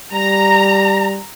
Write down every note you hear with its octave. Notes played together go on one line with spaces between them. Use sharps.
G3 A#5